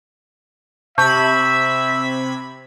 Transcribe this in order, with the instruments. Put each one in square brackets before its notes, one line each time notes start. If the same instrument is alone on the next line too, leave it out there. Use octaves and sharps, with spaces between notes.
[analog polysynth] C3 B5 G#6 [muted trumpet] E5 [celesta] A5 C#6 G6